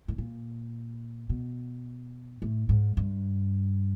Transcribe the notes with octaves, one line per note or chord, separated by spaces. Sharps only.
A2
A#2
B2
A2
G#2
G2